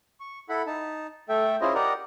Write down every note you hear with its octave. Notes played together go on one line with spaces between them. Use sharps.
C#6
E4 A4 F#5 B5
D#4 A5
A3 A4 E5 G5
C#4 E4 F4 G#4 C5 D#5
G4 A#4 D5 D#5 F#5 A#5